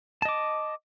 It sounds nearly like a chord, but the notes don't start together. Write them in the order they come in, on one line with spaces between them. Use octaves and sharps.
A5 D#5 D6